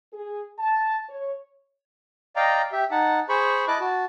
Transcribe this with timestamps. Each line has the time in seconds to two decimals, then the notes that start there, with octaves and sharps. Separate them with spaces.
0.13 G#4
0.59 A5
1.09 C#5
2.36 D5 D#5 F5 G5 A#5
2.72 G4 E5
2.91 D#4 F#5 A5
3.29 G#4 C5 B5 C#6
3.68 E4 D#5 A5 D6 F#6
3.80 F#4 A5